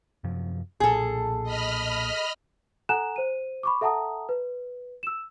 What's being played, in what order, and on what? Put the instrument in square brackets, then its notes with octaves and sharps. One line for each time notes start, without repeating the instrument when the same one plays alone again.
[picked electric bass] F#2 C3 F3
[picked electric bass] B1 A#2 [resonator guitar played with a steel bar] G#4 A4
[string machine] D#5 B5 F6
[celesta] A4 F#5 G#5 A#5 F#6 E7
C5 D#7
B5 C#6 D6
A4 E5 F#5 A5 A#5 D#6
B4
E6 E7